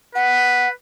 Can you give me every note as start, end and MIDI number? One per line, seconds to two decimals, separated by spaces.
0.15 0.71 71
0.15 0.68 78